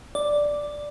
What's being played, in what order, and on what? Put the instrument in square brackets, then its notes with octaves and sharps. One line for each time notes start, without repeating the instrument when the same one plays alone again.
[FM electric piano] D5